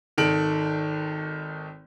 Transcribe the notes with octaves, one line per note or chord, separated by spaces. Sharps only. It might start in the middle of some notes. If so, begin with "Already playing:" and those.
G#1 D#3 A4 D7 F#7